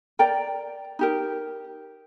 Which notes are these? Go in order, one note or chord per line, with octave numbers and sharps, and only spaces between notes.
A#4 D5 G5 A#5
D#4 G4 A#4